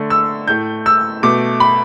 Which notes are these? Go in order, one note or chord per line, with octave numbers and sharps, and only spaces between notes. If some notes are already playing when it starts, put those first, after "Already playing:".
Already playing: D3 A3
E6
A2 A3 G6
E6
B2 A3 D6
B5